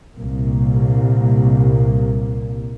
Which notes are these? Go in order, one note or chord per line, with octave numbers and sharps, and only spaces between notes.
C2 A#2 A#3